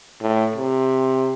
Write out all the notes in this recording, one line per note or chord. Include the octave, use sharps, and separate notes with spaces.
A2
C3